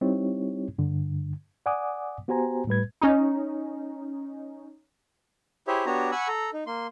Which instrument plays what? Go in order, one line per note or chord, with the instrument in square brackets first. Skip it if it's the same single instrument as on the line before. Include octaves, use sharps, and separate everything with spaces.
[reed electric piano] G3 C4 D#4 E4 G4 C#5
G2 D3
D5 F#5 G#5 D6 D#6
B3 F#4 G4 C5 G#5 A#5
A2 G3 B4 G#6
[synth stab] C#4 D#4
[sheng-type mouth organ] E4 G4 G#4 C5 C#5 E5
B3 D4 F#4 G4 C#5 A#5
F#5 G#5 B5 C#6 E6
A4 A#5
D#4
A#3 C6